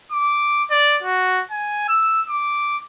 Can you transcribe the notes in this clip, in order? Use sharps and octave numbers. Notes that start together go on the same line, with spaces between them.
D6
D5
F#4
G#5
E6
D6